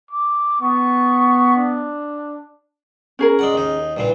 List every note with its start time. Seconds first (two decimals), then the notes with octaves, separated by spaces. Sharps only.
0.11 D6
0.61 B3 C#6
1.56 D4
3.19 C#4 G#4 A#4
3.39 G#3 D5 F#5
3.54 D#2 D#4
3.97 G2 A#2 E3